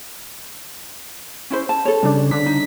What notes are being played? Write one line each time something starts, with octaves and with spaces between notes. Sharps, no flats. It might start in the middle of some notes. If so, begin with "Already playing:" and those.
C#4 E4 C5
A5
A4 C#5
C#3 G3 D4
D3 D4 B6
D#4